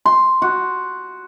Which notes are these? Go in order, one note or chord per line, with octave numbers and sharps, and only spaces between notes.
C6
F#4